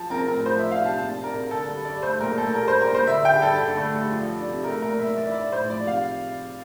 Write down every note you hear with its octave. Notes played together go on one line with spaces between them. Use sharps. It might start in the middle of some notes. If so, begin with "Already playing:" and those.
Already playing: F3 A5
C4 A#4
A2 A#4
F3 C5
D4 E5
F5
C3 A5
A#2 A5
D4
A#4
C2
D3 A4
G2
G2 D5
A3 C5
A#2 A#4
A#2 A4
G3 A#4
D4 C5
A#4
A#2 C5
D3 E5
G2 G5
G2 A4
D3
A3
G2
F3
D4
C3
A3 A#4
A#2 A#4
A#2 E5
E3 D5
E5
D4 D5
A2 C5
F3 D5
C3 F5